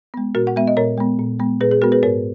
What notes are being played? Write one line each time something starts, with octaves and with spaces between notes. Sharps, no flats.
G#3 B3
A#2 F#4 A#4
F#5
G#3 B3 E5
D#5
A#2 A#4 C#5
G#3 B3
A#2
G#3 B3
A#2 G#4 B4
G#4
G#3 B3 F#4 A#4
G#4 B4
G#2 A#4 C#5